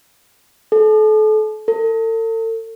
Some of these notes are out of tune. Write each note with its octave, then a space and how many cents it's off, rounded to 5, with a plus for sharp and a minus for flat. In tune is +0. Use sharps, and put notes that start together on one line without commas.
A4 -35
A4 +40